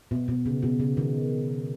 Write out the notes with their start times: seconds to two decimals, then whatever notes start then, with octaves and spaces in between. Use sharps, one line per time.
0.11 B2
0.28 B2
0.46 C#3
0.63 B2
0.80 C#3
0.97 D#3